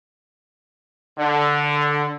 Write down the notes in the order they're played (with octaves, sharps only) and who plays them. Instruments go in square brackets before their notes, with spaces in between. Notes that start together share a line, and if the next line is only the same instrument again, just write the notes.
[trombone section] D3